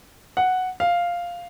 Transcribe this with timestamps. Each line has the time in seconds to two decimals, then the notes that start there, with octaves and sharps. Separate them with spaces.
0.37 F#5
0.80 F5